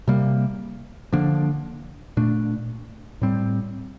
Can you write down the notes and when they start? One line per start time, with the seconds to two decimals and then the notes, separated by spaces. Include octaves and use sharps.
0.08 C3 G3 A#3
1.13 D3 F3 A#3 D4
2.17 A#2 A3 D4
3.21 A2 G3 C4